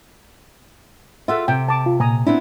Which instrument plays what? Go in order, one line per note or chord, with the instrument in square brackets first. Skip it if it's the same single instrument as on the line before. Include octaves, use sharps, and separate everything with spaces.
[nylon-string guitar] F4 G#4 A4 [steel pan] E5 F#5
[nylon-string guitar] C3 [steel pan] G5
[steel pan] A5 D6
[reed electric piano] F4
[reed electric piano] A#2 [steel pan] G#5 A#5 D#6
[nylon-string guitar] B3 C4 E4 [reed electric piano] D4